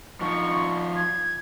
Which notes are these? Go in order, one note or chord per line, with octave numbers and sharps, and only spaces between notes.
F3 D#4 C#6
G#6